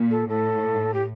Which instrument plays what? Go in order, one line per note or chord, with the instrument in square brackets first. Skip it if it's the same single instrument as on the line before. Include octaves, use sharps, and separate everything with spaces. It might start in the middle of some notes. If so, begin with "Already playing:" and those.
Already playing: [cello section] A#2
[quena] A4
[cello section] A2 [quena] A4
[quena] G4